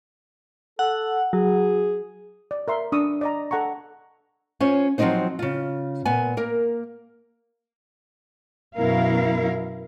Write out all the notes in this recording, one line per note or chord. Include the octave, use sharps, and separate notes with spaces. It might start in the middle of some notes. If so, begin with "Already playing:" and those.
A4 F#5
F#3 G#4
D5
A#4 E5 C6
D4 C#6 D#6 E6
D5 D#5 A#5
A4 F#5 A#5 C#6
C#4 F4 C5 C#5
F3 F#3 G#3 C4 D#4 C5
C#3 F4
A#2 B3 G#5
A#3 A#4
F#2 B2 E4 A#4 F5